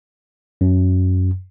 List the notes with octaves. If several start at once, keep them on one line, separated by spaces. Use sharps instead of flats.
F#2